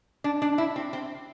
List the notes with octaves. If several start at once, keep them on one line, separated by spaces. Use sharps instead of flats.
D4
D4
E4
C4
C4